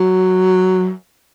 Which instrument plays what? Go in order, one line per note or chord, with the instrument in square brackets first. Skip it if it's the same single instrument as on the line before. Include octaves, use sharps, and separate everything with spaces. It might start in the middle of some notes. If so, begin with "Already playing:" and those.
Already playing: [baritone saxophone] F#3